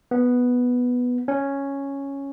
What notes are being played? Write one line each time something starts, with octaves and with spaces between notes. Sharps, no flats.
B3
C#4